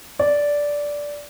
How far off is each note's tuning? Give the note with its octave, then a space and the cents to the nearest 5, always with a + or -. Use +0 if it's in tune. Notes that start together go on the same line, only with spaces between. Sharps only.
D5 -10